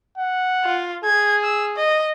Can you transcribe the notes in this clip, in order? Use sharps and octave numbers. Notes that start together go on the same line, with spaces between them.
F#5
F4
G#4 G#6
E6
D#5